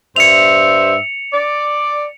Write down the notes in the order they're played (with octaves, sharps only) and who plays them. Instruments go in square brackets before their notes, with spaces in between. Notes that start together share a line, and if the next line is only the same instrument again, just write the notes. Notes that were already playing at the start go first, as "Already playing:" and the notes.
[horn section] G2 C5 E5 [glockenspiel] C#7 F7
[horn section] D5